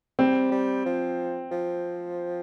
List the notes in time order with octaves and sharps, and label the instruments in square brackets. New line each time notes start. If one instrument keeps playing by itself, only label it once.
[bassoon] G3 [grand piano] C4
[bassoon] G3
F3
F3